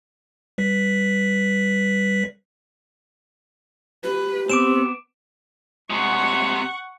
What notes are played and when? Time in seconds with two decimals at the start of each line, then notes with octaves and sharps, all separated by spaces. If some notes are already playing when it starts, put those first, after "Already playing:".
0.58 G3 B4 B6
4.03 G4 B4
4.49 B3 C4 D6 D7 E7
5.90 C3 G#3 F#5 C#6